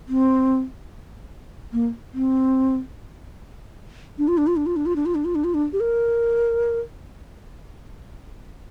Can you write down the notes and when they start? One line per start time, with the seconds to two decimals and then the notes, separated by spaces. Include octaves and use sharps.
0.09 C4
1.73 A#3
2.14 C4
4.18 D4
4.28 F4
4.38 D4
4.47 F4
4.56 D4
4.66 F4
4.76 D4
4.86 F4
4.96 D4
5.06 F4
5.15 D4
5.25 F4
5.35 D4
5.44 F4
5.54 D4
5.73 G4
5.81 A#4